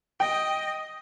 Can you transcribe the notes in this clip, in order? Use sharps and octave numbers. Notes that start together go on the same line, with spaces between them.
D#5 G5